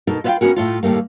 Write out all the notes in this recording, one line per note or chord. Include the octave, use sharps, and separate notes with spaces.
B2 D#4 A4 A#4
F4 B4 C#5 E5 F5 G5
B3 C#4 F#4 A#4
A2 A3 F4
D#2 A2 G3 A3 A#3